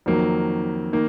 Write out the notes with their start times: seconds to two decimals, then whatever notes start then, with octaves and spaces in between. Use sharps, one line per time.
0.06 F2 D#3 F#3 A#3
0.93 D#3 A#3